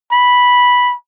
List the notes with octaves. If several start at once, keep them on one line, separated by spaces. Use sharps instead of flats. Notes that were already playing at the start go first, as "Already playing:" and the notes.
B5